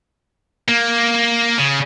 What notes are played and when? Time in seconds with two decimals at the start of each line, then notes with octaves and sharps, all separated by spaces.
0.68 A#3
1.58 C#3